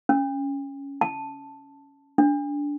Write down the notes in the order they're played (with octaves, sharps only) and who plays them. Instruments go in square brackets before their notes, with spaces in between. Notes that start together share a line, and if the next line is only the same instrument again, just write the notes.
[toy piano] C#4
A5
D4